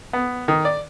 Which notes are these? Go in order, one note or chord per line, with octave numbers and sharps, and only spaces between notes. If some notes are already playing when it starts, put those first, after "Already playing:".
B3
D#3
D5